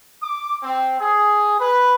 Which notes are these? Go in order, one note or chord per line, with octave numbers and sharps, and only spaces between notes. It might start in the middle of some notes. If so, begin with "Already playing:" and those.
D6
C4
G#4
B4